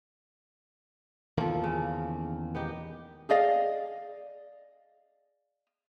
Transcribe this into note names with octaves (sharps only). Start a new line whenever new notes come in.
E2 D#3 F3 A#3 A4
C#3
B3 D#4 G4
G#4 D5 D#5 F5